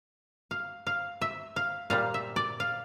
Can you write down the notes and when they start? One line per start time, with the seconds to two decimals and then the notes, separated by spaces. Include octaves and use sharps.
0.51 F5
0.87 F5
1.21 E5
1.56 F5
1.90 A#2 G3 F5
2.14 E5
2.36 D5
2.60 F5